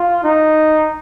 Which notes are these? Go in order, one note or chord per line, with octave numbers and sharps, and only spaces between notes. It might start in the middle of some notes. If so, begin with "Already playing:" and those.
Already playing: F4
D#4